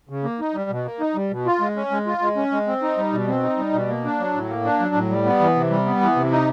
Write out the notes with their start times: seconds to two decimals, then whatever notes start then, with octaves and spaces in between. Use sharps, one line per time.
0.09 C#3
0.24 A#3
0.40 D#4
0.55 G3
0.70 B2
0.85 A#3
1.00 D#4
1.15 G3
1.31 B2
1.46 F4
1.60 G#3
1.76 C#4
1.91 G#3
2.06 F4
2.21 G#3
2.36 C#4
2.52 G#3
2.67 C4
2.82 D#4
2.97 G3
3.13 B2
3.27 C4
3.43 D#4
3.58 G3
3.73 B2
3.88 A#3
4.04 D4
4.19 F#3
4.34 A2
4.49 A#3
4.64 D4
4.80 F#3
4.95 A2
5.10 G3
5.25 B3
5.40 E3
5.56 C3
5.70 G3
5.86 B3
6.01 E3
6.16 C3
6.31 D#4